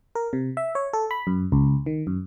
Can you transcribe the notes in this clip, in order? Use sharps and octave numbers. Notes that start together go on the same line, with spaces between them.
A#4
C3
E5
C#5
A4
B5
F#2
C#2
D#3
F#2